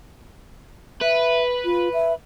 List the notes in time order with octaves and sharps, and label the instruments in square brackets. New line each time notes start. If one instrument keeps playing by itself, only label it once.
[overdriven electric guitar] B4 [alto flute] E5
[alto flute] F4
E5